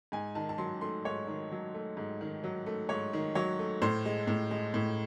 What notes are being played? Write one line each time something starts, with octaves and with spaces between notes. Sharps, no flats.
G#2 G#5
D#3 A5
A5
F#3 C6
A3 C6
G#2 C#5
D#3
F#3
A3
G#2
D#3
F#3
A3
G#2 C#5
D#3
F#3 C#5
A3
A2 C5
G#3
A2
G#3
A2